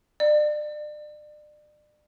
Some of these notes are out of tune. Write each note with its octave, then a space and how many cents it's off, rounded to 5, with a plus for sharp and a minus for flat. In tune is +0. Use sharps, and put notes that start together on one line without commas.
D5 +35